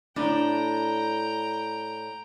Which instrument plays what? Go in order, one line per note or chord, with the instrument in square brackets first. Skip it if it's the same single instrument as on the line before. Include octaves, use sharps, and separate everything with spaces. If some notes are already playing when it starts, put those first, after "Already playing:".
[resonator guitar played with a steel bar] A2 D4 [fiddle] G5 A#5